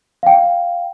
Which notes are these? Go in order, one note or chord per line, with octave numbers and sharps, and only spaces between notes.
F5 G5